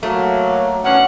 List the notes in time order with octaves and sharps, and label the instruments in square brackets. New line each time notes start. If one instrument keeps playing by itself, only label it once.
[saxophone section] F#3 [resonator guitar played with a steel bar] A3 [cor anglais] A#3
[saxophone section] B2 D#3 C#4 [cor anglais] D4 [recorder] F#5